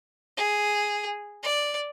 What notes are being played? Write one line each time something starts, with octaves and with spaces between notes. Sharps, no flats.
G#4
D5